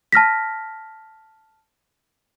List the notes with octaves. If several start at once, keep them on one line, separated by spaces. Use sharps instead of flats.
A5 F6 A#6 B6